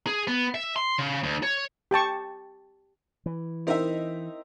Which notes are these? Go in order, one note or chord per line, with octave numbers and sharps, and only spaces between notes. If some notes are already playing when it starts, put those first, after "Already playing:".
G#4
B3
E5
C6
C#3
D2
C#5
G4 G5 A5 C#6
E3
C4 D#4 E4 A#4 D#5 E5